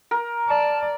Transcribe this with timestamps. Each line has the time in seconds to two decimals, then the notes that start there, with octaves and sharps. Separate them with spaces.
0.11 A#4
0.48 D5 A5